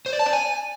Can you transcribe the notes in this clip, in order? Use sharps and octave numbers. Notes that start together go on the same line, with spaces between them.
C5
D5
A5
D5
G#5